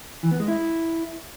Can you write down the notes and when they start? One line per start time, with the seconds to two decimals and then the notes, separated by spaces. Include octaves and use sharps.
0.23 E3
0.31 B3
0.40 G#3
0.48 E4